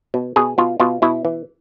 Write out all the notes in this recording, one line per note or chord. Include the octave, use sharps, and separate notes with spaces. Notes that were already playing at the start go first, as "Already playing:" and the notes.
B2
B2 G#4
B2 F4
B2 F4
B2 E4
E3